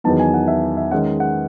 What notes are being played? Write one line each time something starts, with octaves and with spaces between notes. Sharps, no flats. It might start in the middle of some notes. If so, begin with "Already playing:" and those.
E2 D#3 F#3 B3 D#4 A5
G#5
F#5
E5
E5
D#3 G#3 C#4 F#5
F#5